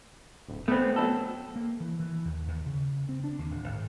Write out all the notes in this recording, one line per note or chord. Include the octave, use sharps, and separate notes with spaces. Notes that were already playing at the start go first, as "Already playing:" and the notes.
D1
A3 B3 C4
F#3 D4 A4
A#3
E3
E3
D#2
D#2
C#3
C4
D4
D#2
D1
G#1